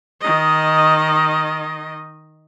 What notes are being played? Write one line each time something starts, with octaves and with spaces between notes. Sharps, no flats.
D#3 D#5